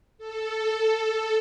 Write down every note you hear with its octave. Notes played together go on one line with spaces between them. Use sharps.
A4